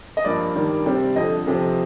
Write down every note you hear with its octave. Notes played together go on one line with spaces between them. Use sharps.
D#5
G2 F3 A#3 D4 D5
G2 D#3 G3 A#3 D4
C3 G3 C4
F2 D3 F3 D#5
F2 C3 F3 C4